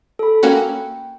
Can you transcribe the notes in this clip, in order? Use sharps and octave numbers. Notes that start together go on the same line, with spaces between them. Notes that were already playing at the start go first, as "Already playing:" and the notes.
A4 B5
A#3 C#4 F#4 G5